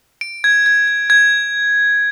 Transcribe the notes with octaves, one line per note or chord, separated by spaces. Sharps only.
D7
G#6
G#6
G#6
G#6